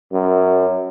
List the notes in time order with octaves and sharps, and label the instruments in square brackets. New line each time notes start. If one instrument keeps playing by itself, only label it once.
[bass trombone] F#2